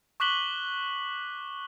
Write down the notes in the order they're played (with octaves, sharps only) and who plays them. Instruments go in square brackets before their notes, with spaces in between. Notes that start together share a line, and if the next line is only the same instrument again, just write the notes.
[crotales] C#6 D6 F#6 B6 F#7 G7